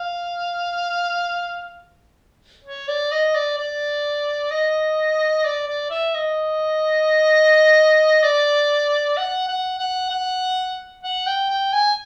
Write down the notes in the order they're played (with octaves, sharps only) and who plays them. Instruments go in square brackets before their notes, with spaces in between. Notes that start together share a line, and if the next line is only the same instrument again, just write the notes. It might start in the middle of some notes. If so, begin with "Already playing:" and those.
Already playing: [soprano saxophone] F5
C#5
D5
D#5
D5
D5
D#5
D5
D5
E5
D#5
D5
F#5
F#5
F#5
F#5
F#5
G5
G5
G#5